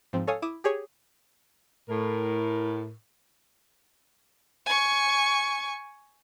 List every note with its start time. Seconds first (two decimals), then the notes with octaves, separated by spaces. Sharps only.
0.13 G#2 F3 C4
0.27 A4 C#5 F5 G#5 D#6
0.42 E4 D6 D#6 D#7 E7
0.64 G4 G#4 C#5
1.89 A2 A#4
4.66 G#5 C#6